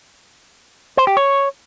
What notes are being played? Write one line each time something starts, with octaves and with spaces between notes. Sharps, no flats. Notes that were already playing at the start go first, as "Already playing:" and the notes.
C5
G4
C#5